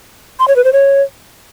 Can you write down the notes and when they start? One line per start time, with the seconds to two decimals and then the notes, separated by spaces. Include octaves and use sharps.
0.39 C6
0.48 C#5
0.56 B4
0.64 C5
0.73 C#5